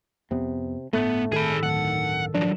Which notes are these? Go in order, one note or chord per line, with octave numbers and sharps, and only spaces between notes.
F2 C3 B3
G1 A2 A3 B3
D#3 G#4 A4 B5
D1 D#3 F#5
F3 F#3 D4